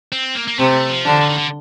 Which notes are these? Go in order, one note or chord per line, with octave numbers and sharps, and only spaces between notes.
C4
A#3
A#3
C3 A3 C4
F3
D3 D4
F3
D#3
D3